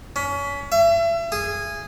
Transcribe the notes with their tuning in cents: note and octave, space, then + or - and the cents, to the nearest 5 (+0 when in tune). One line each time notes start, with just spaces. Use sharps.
C#4 +30
E5 +35
G#4 -10